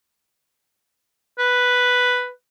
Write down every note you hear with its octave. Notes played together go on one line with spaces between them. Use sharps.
B4